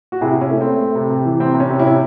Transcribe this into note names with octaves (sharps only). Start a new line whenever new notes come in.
F#4
C3 E4 G#4
C3 C#4 E4
A3
C4
A3
A3
C3
C3
E3
C3 C4
C3
C#4
C3
C#4 E4
C3